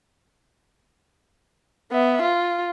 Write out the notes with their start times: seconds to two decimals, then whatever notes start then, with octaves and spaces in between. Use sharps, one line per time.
1.91 B3 E5
2.21 F4